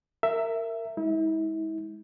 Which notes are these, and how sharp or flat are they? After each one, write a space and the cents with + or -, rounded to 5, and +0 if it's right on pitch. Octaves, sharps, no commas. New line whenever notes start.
A#4 -20 E5 +10
G#3 +0 E4 -40